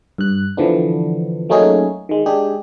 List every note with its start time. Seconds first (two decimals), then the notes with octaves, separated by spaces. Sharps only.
0.18 G2 F#6
0.57 D3 E3 F3 B3 D4
1.49 F#3 A3 A#3 C#4 D#4 G#4
2.09 D#3 G#3
2.26 G#3 D4 G4 G#4